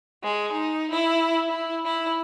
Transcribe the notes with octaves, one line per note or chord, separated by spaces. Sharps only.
G#3
D#4
E4
E4
E4